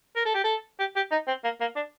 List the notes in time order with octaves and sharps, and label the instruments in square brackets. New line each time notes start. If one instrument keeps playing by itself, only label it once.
[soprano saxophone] A#4
A4
G4
A4
G4
G4
D#4
C4
A#3
A#3
D4